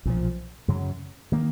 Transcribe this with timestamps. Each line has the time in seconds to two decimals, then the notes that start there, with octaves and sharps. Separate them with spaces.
0.05 B1 A#2 F3
0.68 F#2 C#3 F#3
1.32 D#3 A#3